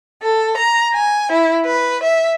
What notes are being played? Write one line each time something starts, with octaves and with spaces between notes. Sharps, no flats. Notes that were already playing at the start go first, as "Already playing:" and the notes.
A4
A#5
G#5
E4
B4
E5